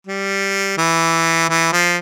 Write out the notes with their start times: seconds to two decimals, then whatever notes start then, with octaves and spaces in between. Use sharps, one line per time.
0.07 G3
0.78 E3
1.49 E3
1.72 F3